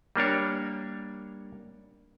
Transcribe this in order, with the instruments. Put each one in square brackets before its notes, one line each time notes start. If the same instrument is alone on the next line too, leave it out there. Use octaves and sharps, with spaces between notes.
[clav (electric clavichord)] G3 A#3 D4 C#5